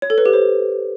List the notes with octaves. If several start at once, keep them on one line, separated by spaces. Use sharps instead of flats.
C#5
A4
B4
G4
C5